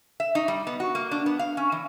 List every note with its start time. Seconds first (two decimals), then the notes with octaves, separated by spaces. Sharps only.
0.20 E5
0.35 D#4
0.48 G3
0.67 B3
0.80 F#4
0.95 A#3
1.11 D4
1.26 B3
1.39 F5
1.57 C#4
1.72 E3